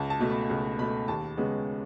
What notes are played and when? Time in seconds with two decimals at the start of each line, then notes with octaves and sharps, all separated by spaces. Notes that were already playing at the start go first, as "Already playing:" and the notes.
Already playing: C#2 A5
0.10 A5
0.20 B2 A3
0.30 B5
0.50 C#2
0.79 B2 A3 B5
1.08 D#2 A5
1.37 C#3 G#3 B3